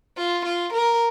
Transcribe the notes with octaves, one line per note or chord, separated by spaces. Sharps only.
F4
F4
A#4